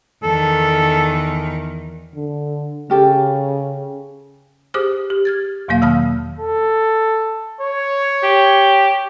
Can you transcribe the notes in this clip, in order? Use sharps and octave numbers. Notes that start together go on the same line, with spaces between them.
E2 D#3 A4
D3
C#3 C#4 G4 A4
G4 G#4 C5 D6 D#6 F6
G4
F6 G#6 A6
E2 B2 F#3 A#3 F5
D#3 F5 A5 B5 D#6 F6
A4
C#5
G4